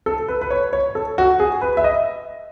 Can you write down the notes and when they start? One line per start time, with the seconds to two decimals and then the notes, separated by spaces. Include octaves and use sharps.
0.06 A4
0.28 B4
0.41 B4
0.50 C#5
0.73 C#5
0.95 A4
1.18 F#4
1.40 G#4
1.61 B4
1.77 E5
1.84 D#5